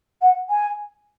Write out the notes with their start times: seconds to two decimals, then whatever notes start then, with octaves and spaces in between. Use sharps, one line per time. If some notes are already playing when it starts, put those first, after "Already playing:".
0.22 F#5
0.49 G#5